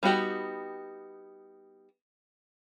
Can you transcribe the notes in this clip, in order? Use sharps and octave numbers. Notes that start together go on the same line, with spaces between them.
G3 B3 D#4 F#4 G4